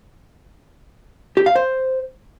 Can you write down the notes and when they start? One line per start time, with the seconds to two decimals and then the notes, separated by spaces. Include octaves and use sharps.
1.37 G4
1.46 F5
1.55 C5